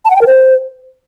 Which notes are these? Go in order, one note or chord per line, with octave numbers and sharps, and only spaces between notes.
A5
F#5
G5
A#4
C5